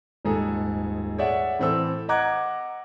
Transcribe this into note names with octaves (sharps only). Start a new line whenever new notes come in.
D#1 G#2 G#4 A4
G#4 C#5 D5 E5 F#5
A2 E3 C4 A4 E6
D#5 F#5 A#5 D6 F#6 G#6